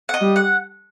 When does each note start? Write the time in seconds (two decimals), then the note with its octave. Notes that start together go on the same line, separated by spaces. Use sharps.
0.09 F#5
0.14 D#5
0.21 G3
0.36 F#5